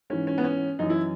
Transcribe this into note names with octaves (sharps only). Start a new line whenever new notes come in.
G#2 E3 C#4
C#4
B3
C#4
F#2 E3 D#4
E4